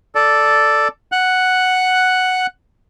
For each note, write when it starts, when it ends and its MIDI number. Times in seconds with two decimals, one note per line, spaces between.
0.15 0.88 69
0.15 0.88 74
1.12 2.46 78
1.12 2.46 90